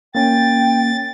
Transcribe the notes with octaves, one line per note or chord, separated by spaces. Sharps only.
A#3 C#4 G5 A6